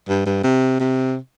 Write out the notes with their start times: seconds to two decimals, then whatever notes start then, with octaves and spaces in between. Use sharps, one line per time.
0.09 G2
0.26 G2
0.44 C3
0.80 C3